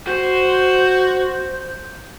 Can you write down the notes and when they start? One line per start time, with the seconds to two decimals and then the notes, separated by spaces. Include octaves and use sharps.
0.07 F#4 C5